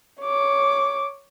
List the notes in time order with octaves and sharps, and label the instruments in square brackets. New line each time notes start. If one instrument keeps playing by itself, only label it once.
[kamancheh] C#5 D6